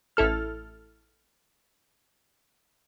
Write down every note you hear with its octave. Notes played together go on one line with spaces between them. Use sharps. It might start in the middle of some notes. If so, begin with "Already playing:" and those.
A1 E4 A4 F6